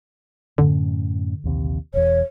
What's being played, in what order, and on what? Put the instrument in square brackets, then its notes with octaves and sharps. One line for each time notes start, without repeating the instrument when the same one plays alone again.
[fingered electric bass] F#2 A2 C#4 [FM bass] D3
[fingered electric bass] A#1 D#2 C3
[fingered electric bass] E1 E2 [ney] C#5